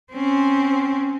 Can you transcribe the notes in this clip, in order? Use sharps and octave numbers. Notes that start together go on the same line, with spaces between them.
C4 C#4